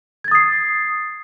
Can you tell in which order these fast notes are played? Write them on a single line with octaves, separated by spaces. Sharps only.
G#6 A6 D#6 C7